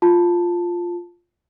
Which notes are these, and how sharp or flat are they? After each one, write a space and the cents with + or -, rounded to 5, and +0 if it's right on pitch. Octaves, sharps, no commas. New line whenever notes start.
F4 +0 A5 +5